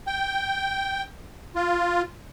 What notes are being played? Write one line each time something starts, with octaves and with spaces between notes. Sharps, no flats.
G5
F4